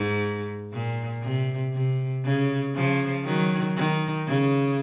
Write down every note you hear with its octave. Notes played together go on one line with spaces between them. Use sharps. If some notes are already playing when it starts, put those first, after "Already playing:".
Already playing: G#2
A#2
C3
C3
C#3
C#3 F3
D#3 F#3
D#3
C#3